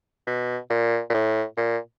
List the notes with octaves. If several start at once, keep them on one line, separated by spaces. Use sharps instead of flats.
B2
A#2
A#2
A2
A#2